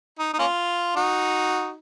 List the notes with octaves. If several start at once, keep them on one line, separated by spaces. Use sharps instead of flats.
D#4
D#4
A#3 C#4 F4
D#4 F#4